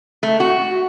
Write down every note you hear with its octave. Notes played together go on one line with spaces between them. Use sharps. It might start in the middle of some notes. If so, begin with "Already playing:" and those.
A3
F#4